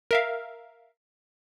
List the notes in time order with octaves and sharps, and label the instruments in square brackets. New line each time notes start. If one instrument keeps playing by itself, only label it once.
[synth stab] A#4 E5 F5